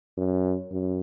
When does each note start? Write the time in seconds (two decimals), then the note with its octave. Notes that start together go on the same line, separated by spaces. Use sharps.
0.17 F#2
0.71 F#2